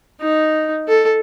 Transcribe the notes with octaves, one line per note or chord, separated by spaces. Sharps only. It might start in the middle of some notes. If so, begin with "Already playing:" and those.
D#4
A4